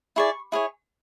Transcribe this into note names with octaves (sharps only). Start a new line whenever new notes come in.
E4 G#4 D5 C#6
E4 G#4 C#5